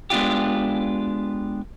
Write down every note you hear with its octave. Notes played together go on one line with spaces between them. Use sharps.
G#3 B3 D4 F4 G4